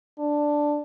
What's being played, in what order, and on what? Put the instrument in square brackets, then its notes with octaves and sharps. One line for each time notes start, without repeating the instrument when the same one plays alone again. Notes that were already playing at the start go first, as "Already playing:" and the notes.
[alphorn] D4